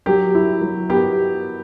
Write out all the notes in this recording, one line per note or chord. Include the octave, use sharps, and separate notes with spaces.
F#3 G4
E4
F#3
B3 G4